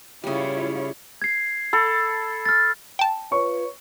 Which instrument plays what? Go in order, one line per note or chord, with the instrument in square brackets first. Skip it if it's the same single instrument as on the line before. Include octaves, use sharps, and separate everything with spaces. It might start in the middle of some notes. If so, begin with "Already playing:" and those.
[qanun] C#3 G3 [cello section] E4 F4 C#5
[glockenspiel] G#6 C7
[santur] A4 [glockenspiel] B5
[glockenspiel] F6 A6
[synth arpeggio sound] G5 A5
[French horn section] F4 B4 C#5 [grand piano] C#6